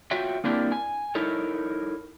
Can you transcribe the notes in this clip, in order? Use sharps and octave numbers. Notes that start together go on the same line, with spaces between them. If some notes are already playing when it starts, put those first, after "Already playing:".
F4 F#4 C#5 E5 G5
A#3 C4 D4 E4 G4 A#4
G#5
D#4 E4 A4 A#4 C#5